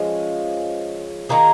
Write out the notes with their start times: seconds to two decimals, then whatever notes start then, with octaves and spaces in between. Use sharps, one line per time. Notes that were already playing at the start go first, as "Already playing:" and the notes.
Already playing: F3 G#3 C#4
1.29 D#3 A#3 F4 G#4